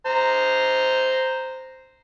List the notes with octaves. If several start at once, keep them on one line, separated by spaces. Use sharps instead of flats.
C5 A#5